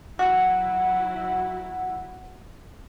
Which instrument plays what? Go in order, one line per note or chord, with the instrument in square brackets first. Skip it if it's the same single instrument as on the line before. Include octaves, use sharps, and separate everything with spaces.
[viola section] F#3 E4 [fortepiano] F#4 [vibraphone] F#5